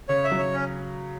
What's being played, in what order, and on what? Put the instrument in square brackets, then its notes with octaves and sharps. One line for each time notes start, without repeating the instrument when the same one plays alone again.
[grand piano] C#3 [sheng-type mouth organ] C#5
[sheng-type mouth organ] E5
[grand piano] F#3
[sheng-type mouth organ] C#5
C#4